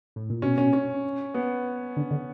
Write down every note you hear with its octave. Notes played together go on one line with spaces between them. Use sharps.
A2
A#2
B2 C#4
C#4
C#4
B3
D3
D3